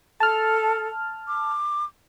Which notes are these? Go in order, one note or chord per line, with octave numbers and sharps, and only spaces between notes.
A4 A5 F6
D6